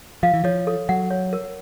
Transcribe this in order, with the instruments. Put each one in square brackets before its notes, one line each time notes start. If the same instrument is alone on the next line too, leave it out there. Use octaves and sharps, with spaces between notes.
[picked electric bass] F3 [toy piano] F5
[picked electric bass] E3
[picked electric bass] F3 [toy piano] C#5
[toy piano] A4
[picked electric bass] F#3 [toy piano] F#5
[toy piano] C#5
A#4